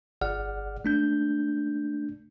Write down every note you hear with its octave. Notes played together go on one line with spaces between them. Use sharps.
G1 G#4 D5 F#5 F6
A3 D4 G6